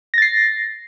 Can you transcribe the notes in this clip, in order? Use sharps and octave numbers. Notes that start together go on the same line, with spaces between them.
A6 A#6 C7